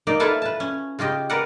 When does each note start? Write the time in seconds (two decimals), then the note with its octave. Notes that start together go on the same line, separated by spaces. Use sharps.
0.07 A#3 D#4 D5
0.20 E4 F4 A4 B4 E5 F5
0.42 B4 A5
0.60 C#4
0.99 C#3 F4 G4 D#5
1.30 A#4 B4 D5 F#5